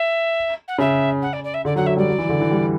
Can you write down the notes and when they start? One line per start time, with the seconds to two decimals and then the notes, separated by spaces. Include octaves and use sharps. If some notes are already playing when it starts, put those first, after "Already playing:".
Already playing: E5
0.68 F#5
0.78 C#3 E5
1.22 F#5
1.33 D5
1.44 D5
1.54 E5
1.65 D3 D5
1.76 F#3 F#5
1.86 F#3 E5
1.97 G3 D5
2.08 F#3
2.18 E3
2.29 D3
2.41 E3
2.51 G3